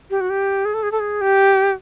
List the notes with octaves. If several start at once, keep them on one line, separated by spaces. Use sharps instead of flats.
G4
F#4
G4
G#4
A4
G#4
A4
G#4
G4